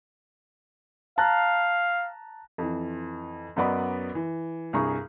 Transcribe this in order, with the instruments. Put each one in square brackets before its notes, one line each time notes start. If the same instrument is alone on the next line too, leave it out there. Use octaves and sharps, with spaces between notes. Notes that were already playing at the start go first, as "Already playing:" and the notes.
[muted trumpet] F5 [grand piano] A5 A#5 F#6
[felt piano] F2 E3
F#2 F#3 B3 D5 D#5 B5
E3
C2 G2 G#4 A#5 C#6